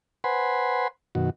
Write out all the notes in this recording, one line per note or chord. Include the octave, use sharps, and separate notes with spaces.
B4 C5 F#5 G#5 B5 C6
F#2 B2 D#3 F#4